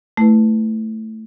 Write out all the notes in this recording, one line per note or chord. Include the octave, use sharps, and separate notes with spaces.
A3 E4 B4